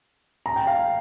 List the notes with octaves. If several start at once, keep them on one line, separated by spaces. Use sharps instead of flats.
A#5
G5
F5 A#5